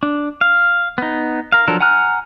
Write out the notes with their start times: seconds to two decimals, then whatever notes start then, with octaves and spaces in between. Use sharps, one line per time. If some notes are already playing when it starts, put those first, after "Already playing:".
0.03 D4
0.41 F5
0.98 B3 D#4
1.52 A#4 F5
1.68 F3 F#3 D4 A4 A#4
1.80 F#5 G#5 A#5 F6 F#6